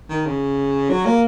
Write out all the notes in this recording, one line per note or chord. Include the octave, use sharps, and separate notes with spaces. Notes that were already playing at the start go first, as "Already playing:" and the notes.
D#3
C#3
F#3
A#3